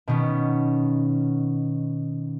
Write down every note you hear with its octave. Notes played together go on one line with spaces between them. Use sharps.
B2 D#3 B3 C#4